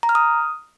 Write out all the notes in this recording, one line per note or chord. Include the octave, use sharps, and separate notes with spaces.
A#5
F6
D#6